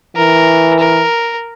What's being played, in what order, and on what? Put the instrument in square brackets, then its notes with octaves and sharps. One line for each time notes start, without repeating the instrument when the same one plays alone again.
[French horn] E3 [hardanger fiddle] A#4
[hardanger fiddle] A#4